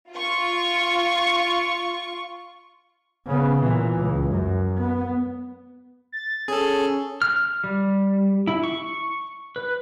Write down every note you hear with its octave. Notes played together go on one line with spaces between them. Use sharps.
F4 C#6
C#3 B3
A#2 E3
C#2
F#2
B3
A6
C#4 G#4 A4
F6
G3
E4
C#6
B4